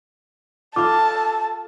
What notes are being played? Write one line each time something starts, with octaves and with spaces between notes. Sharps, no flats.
F4 A4 F5 A5 D6